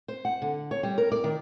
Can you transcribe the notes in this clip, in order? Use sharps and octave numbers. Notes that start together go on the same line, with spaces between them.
C5
F#5
D3
C#5
G3
A#4
D5
D#3